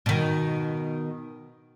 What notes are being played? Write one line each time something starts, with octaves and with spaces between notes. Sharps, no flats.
B2 D#3